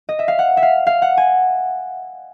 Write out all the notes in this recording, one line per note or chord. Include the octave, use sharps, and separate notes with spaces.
D#5
E5
F5
F#5
E5
F5
F5
F#5
G#5